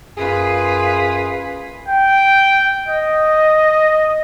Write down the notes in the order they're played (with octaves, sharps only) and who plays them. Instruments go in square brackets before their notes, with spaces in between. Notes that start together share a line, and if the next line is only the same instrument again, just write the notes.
[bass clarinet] F#2 [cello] F4 [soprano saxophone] G#4 [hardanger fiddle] B4 B5
[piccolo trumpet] G5
D#5